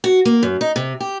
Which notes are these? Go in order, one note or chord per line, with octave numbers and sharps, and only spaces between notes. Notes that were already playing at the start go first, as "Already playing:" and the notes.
F#4
A#3
F#2
D#4
C3
G4